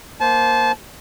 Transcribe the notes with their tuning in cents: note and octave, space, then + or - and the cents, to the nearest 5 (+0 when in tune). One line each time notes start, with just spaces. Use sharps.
A#3 +10 C5 +0 A5 -25